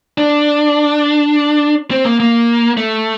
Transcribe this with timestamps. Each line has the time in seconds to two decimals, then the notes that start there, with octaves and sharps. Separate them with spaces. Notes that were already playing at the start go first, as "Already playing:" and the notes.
0.18 D4
1.91 C4
2.05 A#3
2.20 A#3
2.77 A3